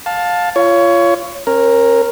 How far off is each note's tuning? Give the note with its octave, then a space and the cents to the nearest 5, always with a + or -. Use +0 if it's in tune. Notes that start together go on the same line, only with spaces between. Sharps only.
F5 +20 A5 +0
F4 -25 C#5 +20
C#4 -35 A#4 +0